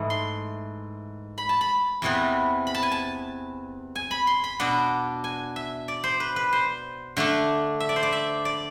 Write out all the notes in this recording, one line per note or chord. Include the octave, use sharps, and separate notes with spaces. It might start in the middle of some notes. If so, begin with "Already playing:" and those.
Already playing: G#2 E3 A3
C6
B5
A5
B5
E2 C3 E3 B3
B5
A5
G#5
A5
G#5
B5
C6
B5
B2 B3 D4
G#5
E5
D5
C5
B4
B4
C5
D3 A3 D4
E5
D5
C5
D5
E5
D5